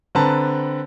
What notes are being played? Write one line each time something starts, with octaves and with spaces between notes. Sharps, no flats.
D3 C4 B4 A5 A#5